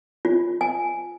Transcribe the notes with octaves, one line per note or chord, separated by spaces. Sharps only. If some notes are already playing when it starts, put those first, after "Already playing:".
F4
G#5